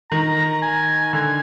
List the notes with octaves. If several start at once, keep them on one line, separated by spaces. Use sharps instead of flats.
D#3 A#5
G#5
D3 G#5